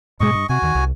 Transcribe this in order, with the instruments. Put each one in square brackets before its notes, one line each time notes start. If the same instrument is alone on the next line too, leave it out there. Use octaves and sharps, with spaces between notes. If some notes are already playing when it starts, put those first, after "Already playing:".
[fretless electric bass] G#2 B2 G#3 [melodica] D#5 C#6
[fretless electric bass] G2
[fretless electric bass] C3 [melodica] F#4 G#5
[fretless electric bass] D#2 D#3
C2